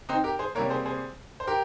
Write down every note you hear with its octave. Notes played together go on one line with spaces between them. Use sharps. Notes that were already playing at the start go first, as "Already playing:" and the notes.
C4 D#4
G4 A#4
G#4 C5
C3 G3 A#3 A#4 C#5
G#4 C5
G#4 C5
C5
G4 A#4